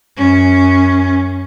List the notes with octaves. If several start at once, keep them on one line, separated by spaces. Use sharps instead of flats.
F#2 C#4